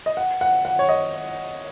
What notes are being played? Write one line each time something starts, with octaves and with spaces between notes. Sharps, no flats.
D#5
F#5
F#5
F#5
C#5
D#5